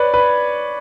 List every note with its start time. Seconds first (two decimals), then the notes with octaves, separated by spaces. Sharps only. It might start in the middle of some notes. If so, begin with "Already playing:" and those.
Already playing: B4 C#5 D5
0.14 B4